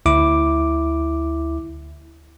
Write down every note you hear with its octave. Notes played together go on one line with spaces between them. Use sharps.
D2 E4 D6